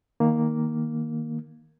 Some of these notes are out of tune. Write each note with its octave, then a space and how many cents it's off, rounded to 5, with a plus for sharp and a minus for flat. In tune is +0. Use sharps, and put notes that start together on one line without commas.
D#3 +0 A#3 +0